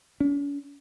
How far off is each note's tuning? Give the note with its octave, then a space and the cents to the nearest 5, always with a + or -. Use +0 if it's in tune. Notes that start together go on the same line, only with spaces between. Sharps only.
C#4 +45